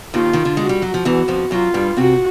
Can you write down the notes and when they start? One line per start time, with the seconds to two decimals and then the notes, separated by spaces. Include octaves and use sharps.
0.14 D#2 D#3 F4
0.33 D#3
0.45 D3
0.57 G#3 F#4
0.69 G3
0.82 F#3
0.94 F3
1.05 E2 E3 F#4
1.28 F2 F3
1.51 F#2 F#3 F4
1.74 G2 G3
1.97 C3 C4 F#4